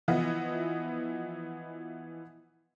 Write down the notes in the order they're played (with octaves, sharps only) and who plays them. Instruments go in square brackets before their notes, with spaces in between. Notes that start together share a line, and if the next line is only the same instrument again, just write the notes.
[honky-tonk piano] E3 F3 B3 E4 D#5